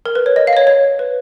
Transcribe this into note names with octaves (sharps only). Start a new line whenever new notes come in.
A#4
B4
C#5
D#5
F5
D#5
C#5
C#5
B4